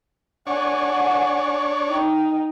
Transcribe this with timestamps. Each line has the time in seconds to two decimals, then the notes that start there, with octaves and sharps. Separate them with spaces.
0.47 D4 C#5 F#5 G#5
1.89 D#4 G5